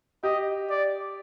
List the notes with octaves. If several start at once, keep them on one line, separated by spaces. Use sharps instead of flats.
G4 D#5
D5